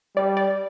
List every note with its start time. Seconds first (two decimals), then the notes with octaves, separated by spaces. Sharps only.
0.16 G3 D5
0.37 D5